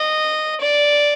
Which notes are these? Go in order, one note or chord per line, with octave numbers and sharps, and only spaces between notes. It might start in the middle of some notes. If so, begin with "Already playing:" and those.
Already playing: D#5
D5